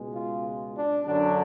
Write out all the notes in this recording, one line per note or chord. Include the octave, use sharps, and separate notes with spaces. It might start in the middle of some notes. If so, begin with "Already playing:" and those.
Already playing: C#2 B2 G#3
F4
D4
F#2 D3 F#3 D4